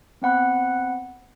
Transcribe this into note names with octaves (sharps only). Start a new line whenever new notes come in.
B3 C4 F#5 B5 F#6